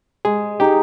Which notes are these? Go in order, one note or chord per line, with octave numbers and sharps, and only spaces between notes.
G#3 G#4
D#4 G4 G#4